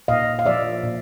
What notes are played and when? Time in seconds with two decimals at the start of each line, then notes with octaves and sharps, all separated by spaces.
0.08 A#2 D#5 F5
0.39 F5
0.46 F3 A#3 D5 E5
0.84 A#2